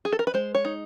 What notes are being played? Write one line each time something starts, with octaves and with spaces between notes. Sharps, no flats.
G#4
A4
A#4
B4
G#3 C5
C#5
D#4